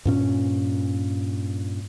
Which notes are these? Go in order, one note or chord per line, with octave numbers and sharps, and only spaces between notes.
G2 A#2 C#4